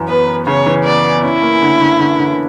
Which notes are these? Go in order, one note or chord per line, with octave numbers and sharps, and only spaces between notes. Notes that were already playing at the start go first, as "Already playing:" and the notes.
Already playing: F#2 E3
B3 B4
B3
C#3 C#5
E3
B3 D5
B3
C#4 E4
A#3
D3
D3
D3
D3